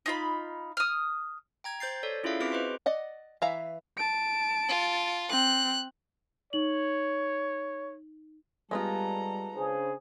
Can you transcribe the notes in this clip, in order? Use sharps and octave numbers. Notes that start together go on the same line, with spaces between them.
D#4 F4 B5
D#6 F6
G5 A#5 G#6
C5 G6 A6 C7
A4 C#5 D5
C#4 E4 F4 G#4 E5 F5
C4 F#4 G#4 B4 D6 D7
B4 C5 D#5 C6
D5 D#5 F#5
E3 E5 F5 A#5
A5 D7
F4
C4 F#6
D#4 C#5 F#7
G3 G#3 B3 F4 A4 A#5
C#3 D4 G#4 C5